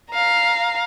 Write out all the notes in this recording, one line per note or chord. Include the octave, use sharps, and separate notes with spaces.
F5 A#5